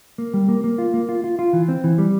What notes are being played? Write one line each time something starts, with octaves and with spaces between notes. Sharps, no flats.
A#3
G3
A#3
A#3
F4
A#3
F4
F4
F4
E3
C4
E3
G3